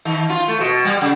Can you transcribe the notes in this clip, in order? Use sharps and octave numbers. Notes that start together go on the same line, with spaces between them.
D#3
F4
A3
B2
G3
C#3